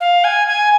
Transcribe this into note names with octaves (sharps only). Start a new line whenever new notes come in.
F5
G#5
G#5